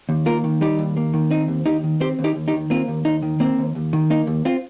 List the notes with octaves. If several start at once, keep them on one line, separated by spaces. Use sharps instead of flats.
D#2
A#3 F4 A#4
D#3
G3 D#4 G4
D#2
A#3
D#3
C4 D#4
D#2
D#2 D#4 G4
D#3
C4 G4 C5
D#2
D#4 G4
D#2
D#4 G4
D#3
A#3 C4 F4
D#2
D#2 D#4
D#3
A#3 C4
D#2
D#2
D#3
A#3 D#4
D#2
C4 F4